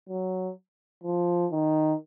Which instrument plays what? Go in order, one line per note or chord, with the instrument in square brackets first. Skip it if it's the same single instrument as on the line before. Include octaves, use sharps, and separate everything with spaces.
[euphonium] F#3
F3
D#3